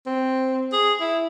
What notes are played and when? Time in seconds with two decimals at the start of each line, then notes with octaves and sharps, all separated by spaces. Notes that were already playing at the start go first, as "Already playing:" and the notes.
0.06 C4
0.73 G#4
1.00 E4